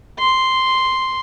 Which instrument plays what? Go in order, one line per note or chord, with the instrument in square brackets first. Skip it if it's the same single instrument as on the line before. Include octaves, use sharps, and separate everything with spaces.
[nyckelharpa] C6